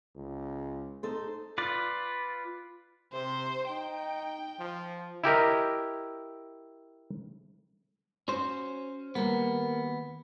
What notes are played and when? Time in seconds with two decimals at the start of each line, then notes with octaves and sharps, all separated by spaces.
0.15 C#2
1.03 D#4 A4 C5
1.58 F4 B4 D5
3.13 C3 C5
3.69 D#4 G5
4.59 F3
5.24 E4 G4 A#4 D#5
8.28 C#4 F#4 C5
9.15 D#2 G3 A#3 B3 F#4